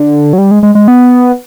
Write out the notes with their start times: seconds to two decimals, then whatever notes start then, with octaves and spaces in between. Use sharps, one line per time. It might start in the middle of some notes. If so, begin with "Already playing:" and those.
Already playing: D3
0.33 F#3
0.38 G3
0.51 G#3
0.63 G#3
0.75 G#3
0.88 B3